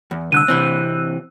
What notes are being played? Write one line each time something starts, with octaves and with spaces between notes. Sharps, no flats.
E2
C2 D3 E6 F#6 D#7
C3 E3 C4